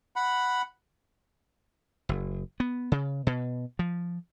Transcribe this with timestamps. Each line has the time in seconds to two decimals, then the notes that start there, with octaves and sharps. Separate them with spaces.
0.16 F#5 B5
2.09 F#1
2.60 B3
2.92 C#3
3.27 B2
3.79 F3